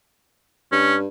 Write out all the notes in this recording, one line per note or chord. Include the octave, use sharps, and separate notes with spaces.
G2 C#4